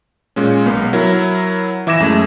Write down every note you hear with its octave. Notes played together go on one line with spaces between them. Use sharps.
A#2 G#3 C#4
B1 A#3 B3
F#3 E4 A#4
E3 E5 D6 G#6 A#6 E7
F#2 G#3 A3